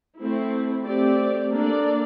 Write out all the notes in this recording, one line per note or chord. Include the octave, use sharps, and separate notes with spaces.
A3 C4 E4
A3 C4 G4 D5
A#3 D4 A4 D5